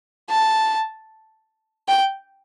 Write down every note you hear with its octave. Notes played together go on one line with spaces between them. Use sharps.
A5
G5